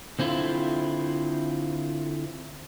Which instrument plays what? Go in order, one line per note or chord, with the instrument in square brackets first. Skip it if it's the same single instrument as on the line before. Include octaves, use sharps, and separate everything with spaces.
[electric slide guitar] D3 C4 E4 F4